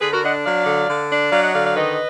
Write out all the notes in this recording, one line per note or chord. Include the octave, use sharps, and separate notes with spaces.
D3 G#4 B4
F#4 A#4
D4 D#5 F#5
F#3 D5 F5
D3
D3
D4
F#3 D5 F5
D#5 F#5
D3 D5 F5
D5 F5
D#3 B4 D#5